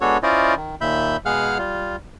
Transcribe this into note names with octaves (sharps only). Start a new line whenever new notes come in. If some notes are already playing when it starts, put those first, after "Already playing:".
G#3 B3 D4 F#4 A4 C#5
C#4 E4 F4 C5 D5 D#5
D#3
D#2 A#2 E5 B5 G6
B2 G#3 G#4 F5 F#5 F6
G3 F4